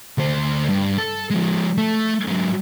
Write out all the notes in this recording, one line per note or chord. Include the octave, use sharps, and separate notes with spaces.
D2 C5
G2
A4
F3 G#3
A3
G#2 F#3